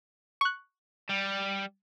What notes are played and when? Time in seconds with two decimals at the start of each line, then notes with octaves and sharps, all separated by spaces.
0.41 C#6 F#6
1.10 G3